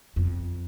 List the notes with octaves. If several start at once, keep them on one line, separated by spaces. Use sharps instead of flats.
F2